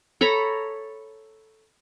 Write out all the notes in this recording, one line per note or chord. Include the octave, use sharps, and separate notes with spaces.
A4 C#5 A#5 B5